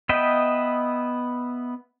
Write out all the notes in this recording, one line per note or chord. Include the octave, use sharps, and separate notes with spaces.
B3 B4 D#5 E5 G5